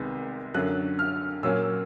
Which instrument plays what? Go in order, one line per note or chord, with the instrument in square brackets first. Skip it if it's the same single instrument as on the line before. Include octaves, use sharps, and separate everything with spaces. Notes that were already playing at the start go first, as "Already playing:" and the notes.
Already playing: [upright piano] C2 C3 D#3 G#3 B3
F#2 D3 F#3 F#6
F6
A#2 F#3 A#3 C#4 E6